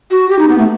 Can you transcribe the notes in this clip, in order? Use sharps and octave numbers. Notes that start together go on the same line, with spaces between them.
F#4
G4
D#4
B3
A3